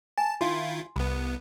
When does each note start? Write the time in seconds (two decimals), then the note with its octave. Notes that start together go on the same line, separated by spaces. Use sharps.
0.18 G#5 A5
0.41 D#3 E4 F4 C6
0.96 C2 B3 B5